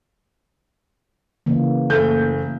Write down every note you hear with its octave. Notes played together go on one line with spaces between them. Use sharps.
C#3 E3 A#3
F#1 A3 G6